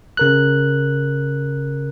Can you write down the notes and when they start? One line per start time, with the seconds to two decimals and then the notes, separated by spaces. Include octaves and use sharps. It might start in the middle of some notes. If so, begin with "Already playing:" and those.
0.17 C#3 A#4 F#6